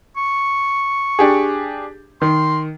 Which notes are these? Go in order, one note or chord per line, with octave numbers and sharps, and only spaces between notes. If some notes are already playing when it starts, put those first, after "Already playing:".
C#6
D4 G4 G#4
D#3 C6